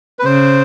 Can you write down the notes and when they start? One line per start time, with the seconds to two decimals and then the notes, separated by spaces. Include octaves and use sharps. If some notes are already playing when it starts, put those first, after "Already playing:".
0.19 B4
0.25 C#3 C5